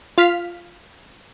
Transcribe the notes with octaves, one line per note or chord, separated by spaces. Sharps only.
F4 F6 B6